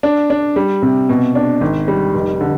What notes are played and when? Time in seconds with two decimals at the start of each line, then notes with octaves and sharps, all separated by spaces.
0.03 D4
0.30 D4
0.56 G3
0.82 C3
1.09 B2
1.35 D4
1.61 G#1
1.88 G3
2.14 F1
2.41 D3